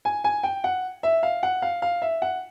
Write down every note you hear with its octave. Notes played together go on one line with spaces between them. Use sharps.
G#5
G#5
G5
F#5
E5
F5
F#5
F5
F5
E5
F#5